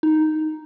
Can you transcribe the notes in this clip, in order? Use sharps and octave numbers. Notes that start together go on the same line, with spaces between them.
D#4